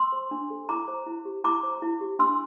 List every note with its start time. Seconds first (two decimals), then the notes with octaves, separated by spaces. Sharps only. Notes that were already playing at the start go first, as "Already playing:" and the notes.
Already playing: C6 E6
0.12 C5
0.31 D4
0.50 A4
0.69 E4 A#5 D6
0.88 C5
1.07 E4
1.25 G4
1.44 E4 A#5 D6
1.63 C5
1.82 E4
2.01 G4
2.19 D4 C6 E6